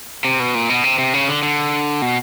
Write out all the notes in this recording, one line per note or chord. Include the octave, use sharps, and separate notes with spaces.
C3
B2
A#2
B2
C3
C3
C#3
D3
D3
B2